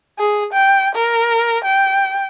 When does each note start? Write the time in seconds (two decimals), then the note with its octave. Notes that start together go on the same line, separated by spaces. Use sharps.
0.18 G#4
0.53 G5
0.95 A#4
1.64 G5